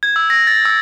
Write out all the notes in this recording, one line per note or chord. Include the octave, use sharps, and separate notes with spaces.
G#6
E6
A#6
A6
E6